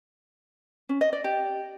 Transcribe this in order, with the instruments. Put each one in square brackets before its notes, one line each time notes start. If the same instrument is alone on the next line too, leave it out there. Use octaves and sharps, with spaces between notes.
[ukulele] C#4
D#5
D5
G4